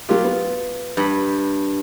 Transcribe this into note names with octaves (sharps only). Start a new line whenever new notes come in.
F#3 A#3 F4 G4
B3
G2 B5